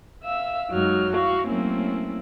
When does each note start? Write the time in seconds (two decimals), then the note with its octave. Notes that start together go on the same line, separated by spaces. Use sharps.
0.23 E5 F5 E6
0.71 F#2 F#3 G#3 D#4 F6
1.13 E4 F#4 F5 C#6
1.47 F#3 A3 A#3 C4 C#4 E4